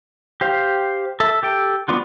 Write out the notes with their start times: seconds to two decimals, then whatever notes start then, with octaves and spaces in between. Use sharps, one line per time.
0.41 G4 C5 F5
1.20 A4 E5
1.43 G4 A4 G5
1.88 G3 B3 D4 F4 F#4